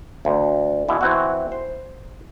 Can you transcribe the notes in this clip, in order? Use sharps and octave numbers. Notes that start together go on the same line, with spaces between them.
D2
B2 E3
E3 C4 F#4
C5